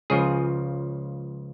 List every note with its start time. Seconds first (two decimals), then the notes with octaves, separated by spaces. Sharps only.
0.10 C#2 C#3 F3 G#4